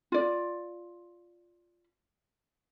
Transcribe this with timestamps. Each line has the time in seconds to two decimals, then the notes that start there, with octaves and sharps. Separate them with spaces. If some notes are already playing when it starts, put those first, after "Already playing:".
0.12 F4 D5